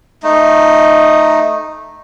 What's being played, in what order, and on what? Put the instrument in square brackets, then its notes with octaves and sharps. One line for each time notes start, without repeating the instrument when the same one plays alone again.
[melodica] A3 D#4